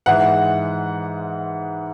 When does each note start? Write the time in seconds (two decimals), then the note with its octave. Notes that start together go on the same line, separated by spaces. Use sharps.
0.06 G#2 E3 G#3 F#5